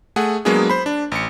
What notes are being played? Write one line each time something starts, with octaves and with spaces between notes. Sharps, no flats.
A3 G#4 F#5
F#3 G#3 A#3 B3 D4 G#4
C5 B5
D4
A1 C#7